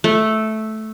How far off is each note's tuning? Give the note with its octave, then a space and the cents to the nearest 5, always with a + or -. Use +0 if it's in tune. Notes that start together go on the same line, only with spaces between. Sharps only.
A3 -10